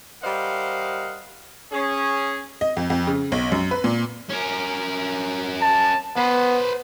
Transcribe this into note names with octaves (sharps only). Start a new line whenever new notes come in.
G3 A#4 C5 D#5 F5 F#5
C#4 G#4
D#5
F2
F2
C#3
B1
F#2
B4
A#2
C#4 A#4
A5
B3 B4 C5